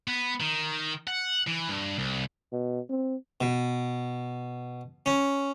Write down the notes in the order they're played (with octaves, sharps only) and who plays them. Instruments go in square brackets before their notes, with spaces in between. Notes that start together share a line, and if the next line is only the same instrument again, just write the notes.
[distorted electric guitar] B3
D#3
F#5
E3
G2
C2
[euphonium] B2
C4
[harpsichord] B2
C#4